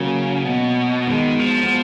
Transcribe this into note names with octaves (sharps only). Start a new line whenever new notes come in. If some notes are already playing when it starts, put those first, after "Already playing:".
Already playing: C#3 F#3 A#3
B2
D#3 G#3 B3
F3
B3